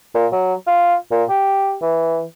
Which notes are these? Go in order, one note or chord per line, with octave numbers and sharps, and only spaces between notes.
A#2
F#3
F4
A#2
G4
E3